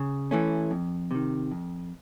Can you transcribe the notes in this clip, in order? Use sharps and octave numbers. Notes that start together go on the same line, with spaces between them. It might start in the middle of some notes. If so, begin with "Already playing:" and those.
Already playing: C#3
E3 A3 C#4
F2
C3 D#3
F2